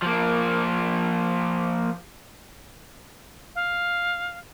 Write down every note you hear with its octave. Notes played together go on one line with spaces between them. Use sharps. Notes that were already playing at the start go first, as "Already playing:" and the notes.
F3 A#3
F5